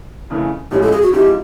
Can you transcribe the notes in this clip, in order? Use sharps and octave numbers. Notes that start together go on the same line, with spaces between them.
F2 C#3 E3 A3
A1 A2 F3 G#3 C#4 G4
A4
G#4
F#4
G#2 F3 G#3 C4 E4 G4